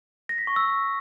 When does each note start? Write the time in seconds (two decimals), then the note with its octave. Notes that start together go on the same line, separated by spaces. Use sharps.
0.29 A#6
0.38 B6
0.47 C#6
0.56 E6